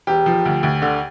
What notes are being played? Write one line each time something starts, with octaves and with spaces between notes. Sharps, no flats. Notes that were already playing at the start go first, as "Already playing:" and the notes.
E1 G4
F3
D2
D2
D3